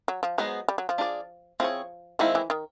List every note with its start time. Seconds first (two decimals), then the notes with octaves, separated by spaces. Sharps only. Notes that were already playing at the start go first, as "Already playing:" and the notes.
0.08 F#3
0.23 F3
0.38 F#3 G#3 B3 D#4 G#4 C5
0.68 G3
0.78 F#3
0.89 F3
0.98 D4 F4 G#4 B4 D5
1.60 F3 C4 E4 G#4 C#5
2.19 D#3 F3 G#3 C4 E4
2.35 E3
2.50 D#3